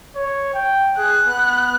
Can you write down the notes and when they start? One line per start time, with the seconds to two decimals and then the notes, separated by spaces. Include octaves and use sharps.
0.16 C#5
0.54 G5
0.98 G#4 F#6
1.27 B3